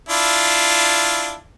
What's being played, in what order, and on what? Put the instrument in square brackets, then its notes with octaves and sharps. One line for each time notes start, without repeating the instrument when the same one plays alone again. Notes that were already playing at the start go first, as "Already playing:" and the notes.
[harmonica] D4 E4 F4